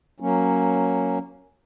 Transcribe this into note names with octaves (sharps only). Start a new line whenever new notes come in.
F#3 A#3 C#4